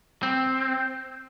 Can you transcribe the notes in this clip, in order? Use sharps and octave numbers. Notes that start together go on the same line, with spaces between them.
C4